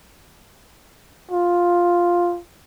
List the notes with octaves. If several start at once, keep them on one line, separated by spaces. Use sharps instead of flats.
F4